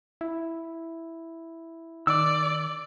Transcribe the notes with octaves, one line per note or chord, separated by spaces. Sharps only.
E4
D#3 D5 D6 E6